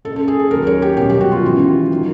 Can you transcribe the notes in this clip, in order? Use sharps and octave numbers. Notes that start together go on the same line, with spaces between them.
F#1 F#2 C#3 A4
A4
G#4
A4
D#2 C#3 F#3 A#4
C#5
G4
C2 B2 F#3 G4
G4
F#4
F4
G#1 F#2 C#3 E3
D#3 F#3